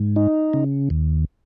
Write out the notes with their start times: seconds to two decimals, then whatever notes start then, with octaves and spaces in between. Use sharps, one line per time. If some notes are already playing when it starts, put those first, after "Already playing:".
Already playing: G#2
0.16 D#4
0.53 C#3
0.90 D#2